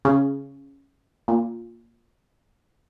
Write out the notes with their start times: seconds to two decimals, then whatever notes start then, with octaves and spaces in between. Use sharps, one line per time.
0.05 C#3
1.28 A#2